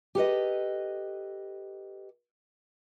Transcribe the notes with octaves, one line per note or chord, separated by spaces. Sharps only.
G4 A4 B4 D#5